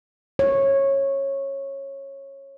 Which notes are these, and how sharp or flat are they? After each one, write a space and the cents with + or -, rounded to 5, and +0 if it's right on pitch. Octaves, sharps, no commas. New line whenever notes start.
C#5 -15